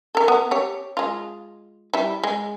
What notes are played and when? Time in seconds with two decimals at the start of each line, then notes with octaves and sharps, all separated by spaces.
0.15 A4 A#4
0.28 B3
0.51 G4 C#5
0.97 G#3 F4
1.94 G3 E4
2.24 G#3